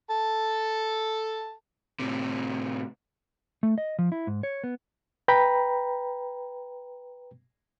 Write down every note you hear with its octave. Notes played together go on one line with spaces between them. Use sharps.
A4 A5
A2 C3
A3
D#5
F3
E4
G#2
C#5
B3
B4 G5 A#5 B5